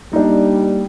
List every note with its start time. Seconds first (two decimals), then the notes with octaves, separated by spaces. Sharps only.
0.13 G3 A#3 D4 D#4